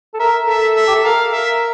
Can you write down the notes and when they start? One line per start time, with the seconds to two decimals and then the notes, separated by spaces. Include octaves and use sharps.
0.14 A4
0.20 A#4 E5
0.48 A4 E5
0.76 E5
0.88 G4
0.95 A4
1.04 A#4 F5
1.32 E5